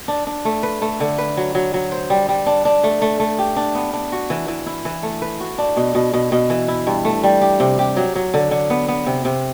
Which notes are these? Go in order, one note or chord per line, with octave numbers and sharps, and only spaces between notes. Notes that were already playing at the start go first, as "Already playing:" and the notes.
D4
D4
A3
B4
A3
D3
B4
F#3
F#3
F#3
C5
G3
G3
D4
D4
A3
A3
A3
G4
D4
B3
D4
F#4
E3
E3
E4
E3
A3
B4
F#4
D4
B2
B2
B2
B2
E3
E4
G2
A3
G3
G4
C3
G4
F#3
F#3
D3
D3
B3
B3
C3
C3